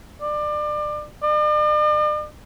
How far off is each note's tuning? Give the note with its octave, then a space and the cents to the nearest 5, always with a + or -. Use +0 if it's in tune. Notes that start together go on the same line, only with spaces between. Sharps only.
D5 +30
D5 +45